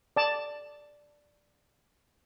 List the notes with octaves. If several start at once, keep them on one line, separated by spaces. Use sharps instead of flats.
D5 A5